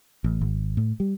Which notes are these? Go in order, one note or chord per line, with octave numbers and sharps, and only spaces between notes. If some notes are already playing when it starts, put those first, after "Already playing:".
A1
G#1
A2
G3